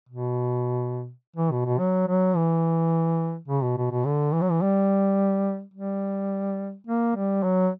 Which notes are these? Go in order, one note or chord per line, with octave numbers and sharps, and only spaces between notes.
B2
E3
B2
B2
F#3
F#3
E3
C#3
B2
B2
B2
D3
E3
F#3
E3
G3
G3
A#3
G3
F#3